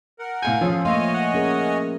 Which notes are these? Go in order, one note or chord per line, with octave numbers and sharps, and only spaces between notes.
A#4 F#5
A2 F5 G#5 G6
F3 C#4 F4 G#4 A4
F3 A3 A#3 C#5 D#5 F5 G#5 C6
F#5
C#4 G#4 A#4